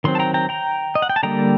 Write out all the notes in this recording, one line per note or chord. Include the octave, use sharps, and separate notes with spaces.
D#3 F#3 C4 C6
A5
G5 A#5
G5 A#5
G5 A#5
D#5
F#5
G5
A5
D3 G3 A#3 G5 A#5